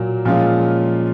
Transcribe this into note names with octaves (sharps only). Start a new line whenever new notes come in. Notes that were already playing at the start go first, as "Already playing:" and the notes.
Already playing: A#2 F#3 A#3
A#2 F3 G#3 C#4 F4